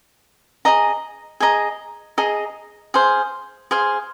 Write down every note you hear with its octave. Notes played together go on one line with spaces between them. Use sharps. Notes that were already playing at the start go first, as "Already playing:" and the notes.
G#4 D#5 A#5
G#4 D#5 A#5
G#4 D#5 A#5
G#4 C5 F5
G#4 C5 F5